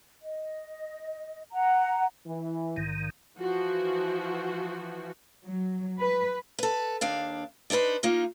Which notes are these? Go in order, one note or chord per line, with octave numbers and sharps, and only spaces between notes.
D#5
F#5 A#5
E3
A#1 G#2 D#3
E3 F3 F#4
F#3
B4
A4 B4
D#2 D4 F5
D4 D#4 G#4 B4 C5
A#3 D#4 F4